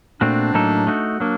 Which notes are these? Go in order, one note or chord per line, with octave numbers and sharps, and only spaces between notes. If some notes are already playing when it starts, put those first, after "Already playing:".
A#2 A3 C4 D4 F#4
A2 F#3 A#3 D#4 A4
A3 D#4 F#4
F#3 A#3 D4